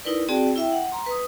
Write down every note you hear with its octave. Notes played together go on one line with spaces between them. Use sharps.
D#4 E4 A#4 B4 D5
C4 F#4 G#4 D5 G5 A5
E4 E5 G5
F#5
A#5 C6
B4 D#6